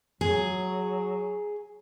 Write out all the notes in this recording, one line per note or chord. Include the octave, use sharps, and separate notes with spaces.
F#3 G#4